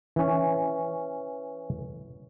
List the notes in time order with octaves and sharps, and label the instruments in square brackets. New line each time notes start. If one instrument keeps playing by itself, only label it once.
[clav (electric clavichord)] E3 C#4